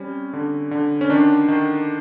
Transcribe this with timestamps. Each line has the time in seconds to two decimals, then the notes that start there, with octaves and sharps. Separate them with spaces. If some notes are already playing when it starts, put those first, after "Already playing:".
Already playing: G3 C4 C#4
0.33 D3
0.71 D3
1.01 C#4
1.10 D#3 D4
1.48 D#3